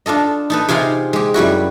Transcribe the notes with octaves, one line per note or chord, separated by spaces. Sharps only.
D4 F4 A4 D#5
D#4 A4 B4
C3 D#4 F4 G#4 D#5 C6
G#3 G4
F#2 G3 E4 F#4